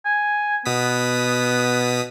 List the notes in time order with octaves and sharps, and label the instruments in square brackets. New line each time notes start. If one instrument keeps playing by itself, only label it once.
[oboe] G#5
[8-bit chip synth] B2 D#6 B6 [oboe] B3